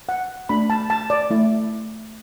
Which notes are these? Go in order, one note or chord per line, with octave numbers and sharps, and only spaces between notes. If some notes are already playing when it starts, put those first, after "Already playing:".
F#5
A3 D4 F#4 B5
A5
A5
D5
A3 E4